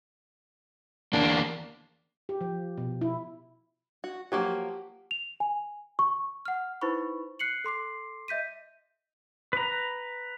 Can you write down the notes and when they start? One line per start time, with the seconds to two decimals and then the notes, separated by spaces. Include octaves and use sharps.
1.13 E2 A#3 D4
2.29 G4
2.41 F3
2.78 B2
3.01 E4
4.04 F#4
4.32 F3 F#3 A#3 G4 F#5
5.11 F7
5.40 G#5
5.99 C#6
6.45 F#5 F6
6.81 D#4 E4 B4 C5 B5 C#6
7.39 F#6 C7 C#7 F#7
7.64 A4 C6 D6 C7
8.28 D#5 E5 G6 B6 D#7
9.53 B4 A#5